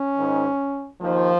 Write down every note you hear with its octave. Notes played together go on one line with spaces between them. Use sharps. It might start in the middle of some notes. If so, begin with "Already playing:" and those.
Already playing: C#4
G#2 D#3
D#2 D#3 F3